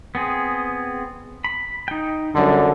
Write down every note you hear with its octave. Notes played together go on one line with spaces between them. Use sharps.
B3 C4 G#4
B5
D#4 G5
F#2 D3 G3